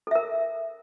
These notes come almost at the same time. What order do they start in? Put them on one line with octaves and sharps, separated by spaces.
A4 E5 A#4